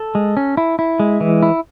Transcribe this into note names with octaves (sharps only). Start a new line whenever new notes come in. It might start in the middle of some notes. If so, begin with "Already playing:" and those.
Already playing: A4
G#3
C#4
E4
E4
G#3
E3
E4